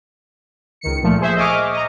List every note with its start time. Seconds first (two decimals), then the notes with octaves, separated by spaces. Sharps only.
0.81 C#2 D#3 C#7
1.03 A#2 F3 A3
1.20 G#4 C5 E5
1.36 D#5 E5 G#5 C#6 D6 F6
1.72 D#5 A#5